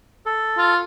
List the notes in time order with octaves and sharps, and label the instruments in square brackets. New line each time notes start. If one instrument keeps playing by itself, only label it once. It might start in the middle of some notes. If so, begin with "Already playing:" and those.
[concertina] A4
[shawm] F4